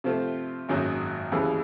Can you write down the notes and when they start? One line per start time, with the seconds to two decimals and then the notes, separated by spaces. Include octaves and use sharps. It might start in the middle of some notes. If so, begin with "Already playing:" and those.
0.04 C3 F3 A3 C4 F4
0.69 G#1 F#2 D#3 F#3 A#3
1.32 D#2 C#3 E3 G#3